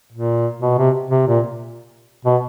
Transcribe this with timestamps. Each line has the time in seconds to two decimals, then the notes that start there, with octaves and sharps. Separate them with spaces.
0.12 A#2
0.62 B2
0.78 C3
1.11 C3
1.27 A#2
2.25 B2